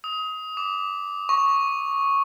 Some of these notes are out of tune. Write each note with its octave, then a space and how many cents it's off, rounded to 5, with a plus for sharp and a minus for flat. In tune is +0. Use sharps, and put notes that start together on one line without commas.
D#6 +25
D6 -10
C#6 -5